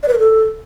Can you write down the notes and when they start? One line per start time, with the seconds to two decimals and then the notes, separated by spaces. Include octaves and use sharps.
0.03 D5
0.08 B4
0.13 A#4
0.18 A4